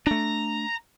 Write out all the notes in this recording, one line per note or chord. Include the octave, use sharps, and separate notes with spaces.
A3 D4 A#5